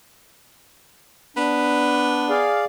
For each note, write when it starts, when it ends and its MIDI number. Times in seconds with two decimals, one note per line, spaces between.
1.37 2.50 59
1.37 2.29 62
2.29 2.65 68
2.29 2.65 74
2.29 2.65 77